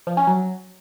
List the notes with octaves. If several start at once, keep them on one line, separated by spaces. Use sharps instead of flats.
F3
C#4
F#3